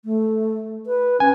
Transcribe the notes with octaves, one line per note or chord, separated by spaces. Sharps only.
A3
B4
C#4 G#5